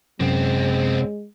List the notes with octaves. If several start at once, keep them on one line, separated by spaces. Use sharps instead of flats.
F#2 C3 G#3 B3 C4